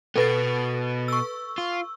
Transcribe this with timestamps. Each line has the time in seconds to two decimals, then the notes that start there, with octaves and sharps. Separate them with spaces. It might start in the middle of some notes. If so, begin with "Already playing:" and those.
0.16 B2 B3 A4 B4 A6
1.08 C#6 E6
1.58 F4